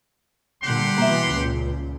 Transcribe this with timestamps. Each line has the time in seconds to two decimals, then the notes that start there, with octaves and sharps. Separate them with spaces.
0.63 A#2 D3 G3 G4 F#5 C6
0.98 B2 E3 A#3 E5
1.32 C#2 A#2